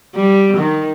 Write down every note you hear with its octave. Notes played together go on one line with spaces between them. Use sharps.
G3
D#3